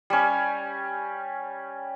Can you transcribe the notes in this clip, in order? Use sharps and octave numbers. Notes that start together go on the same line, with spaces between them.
G3 C#4